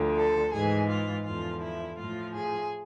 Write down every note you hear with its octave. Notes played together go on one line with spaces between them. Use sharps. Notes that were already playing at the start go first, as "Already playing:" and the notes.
Already playing: D2 D3 F3
A4
G#2 E3 G#4
F4
E2 D3 F3 F4
E4
A2 F3 F4
G#4